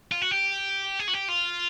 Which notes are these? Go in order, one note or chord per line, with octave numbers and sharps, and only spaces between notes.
F4
F#4
G4
G#4
F#4
G4
F4